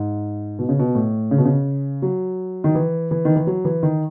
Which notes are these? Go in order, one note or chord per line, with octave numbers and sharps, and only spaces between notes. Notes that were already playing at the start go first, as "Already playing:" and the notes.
Already playing: G#2
B2
C#3
B2
A2
C#3
B2
C#3
F#3
D#3
E3
E3
D#3
E3
F#3
E3
D#3